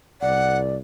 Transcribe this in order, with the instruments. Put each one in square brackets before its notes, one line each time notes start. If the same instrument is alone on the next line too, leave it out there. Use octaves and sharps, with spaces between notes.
[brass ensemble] C2 [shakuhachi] D5 [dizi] F#5